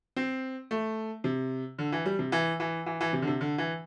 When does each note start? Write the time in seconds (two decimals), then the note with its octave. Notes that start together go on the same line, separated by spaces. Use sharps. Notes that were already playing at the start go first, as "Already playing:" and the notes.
0.16 C4
0.71 A3
1.24 C3
1.79 D3
1.92 E3
2.06 G3
2.19 C3
2.32 E3
2.60 E3
2.86 E3
3.01 E3
3.13 C3
3.22 D3
3.27 C3
3.41 D3
3.58 E3